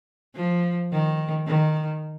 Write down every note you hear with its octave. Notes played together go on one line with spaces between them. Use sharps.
F3
D#3
D#3